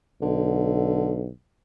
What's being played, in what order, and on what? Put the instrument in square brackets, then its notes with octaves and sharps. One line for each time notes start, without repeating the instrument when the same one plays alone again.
[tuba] B1 [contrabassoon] D3